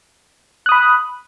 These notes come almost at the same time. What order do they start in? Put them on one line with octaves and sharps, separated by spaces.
F#6 D#6 B5